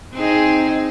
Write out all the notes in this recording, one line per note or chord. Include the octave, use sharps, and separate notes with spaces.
C4 D#4 G#4